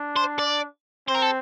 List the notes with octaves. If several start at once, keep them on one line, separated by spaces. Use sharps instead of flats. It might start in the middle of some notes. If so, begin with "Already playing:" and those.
Already playing: D4
C5
D5
C4 C5
A#4
A4